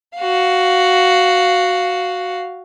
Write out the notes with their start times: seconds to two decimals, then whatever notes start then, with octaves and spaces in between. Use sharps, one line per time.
0.18 F#4 F5